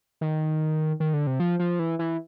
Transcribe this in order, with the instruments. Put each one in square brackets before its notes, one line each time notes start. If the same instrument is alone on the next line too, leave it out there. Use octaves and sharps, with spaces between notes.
[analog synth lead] D#3
D#3
D3
C3
F3
F3
E3
E3